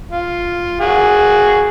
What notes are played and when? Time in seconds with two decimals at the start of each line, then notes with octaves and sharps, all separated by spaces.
0.10 F4
0.80 F#4 G#4